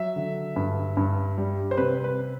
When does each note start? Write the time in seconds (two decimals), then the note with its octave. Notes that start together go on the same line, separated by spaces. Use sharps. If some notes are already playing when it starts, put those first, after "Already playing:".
Already playing: F#3 E5
0.16 D3
0.56 G2
0.97 G2
1.38 G3
1.71 C5
1.77 C3 B4
2.04 B4